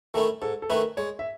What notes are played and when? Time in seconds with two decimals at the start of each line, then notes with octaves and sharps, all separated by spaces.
0.14 D#3 A3 C#4 E4 A4
0.42 G#2 A4
0.62 A4
0.69 D#3 A3 C#4 E4 B4
0.97 G#3 C#5
1.19 E5